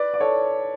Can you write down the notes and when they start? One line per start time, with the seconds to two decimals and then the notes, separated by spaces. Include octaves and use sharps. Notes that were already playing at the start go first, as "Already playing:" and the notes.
Already playing: B4 D5
0.14 D5
0.20 A4 C#5